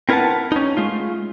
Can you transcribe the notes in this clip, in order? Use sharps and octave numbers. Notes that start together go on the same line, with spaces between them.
C4 E4 A#4 B4 F#5 A5
C#4 D#4
G#3 A3 F4